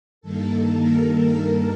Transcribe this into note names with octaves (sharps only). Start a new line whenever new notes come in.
G2 D#3 A#3 A4
A#4
A#4
A4